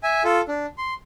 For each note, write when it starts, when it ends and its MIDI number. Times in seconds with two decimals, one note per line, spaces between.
0.03 0.23 76
0.03 0.23 80
0.24 0.41 65
0.24 0.41 69
0.48 0.66 62
0.78 0.94 84